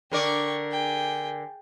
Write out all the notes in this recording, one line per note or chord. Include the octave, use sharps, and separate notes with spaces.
D3 A#4 D5 G5 C#6
G#4 G5